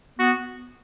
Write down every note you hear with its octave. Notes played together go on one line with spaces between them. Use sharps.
B3 F#4